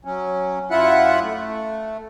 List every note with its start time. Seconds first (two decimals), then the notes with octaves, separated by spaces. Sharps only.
0.05 F#3 C#4
0.71 F#2 E4 F4 E5 F#5 F#6
1.23 A3